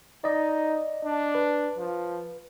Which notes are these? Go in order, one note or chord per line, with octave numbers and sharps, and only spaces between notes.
D#4 D5 D#5
D4
B4
F3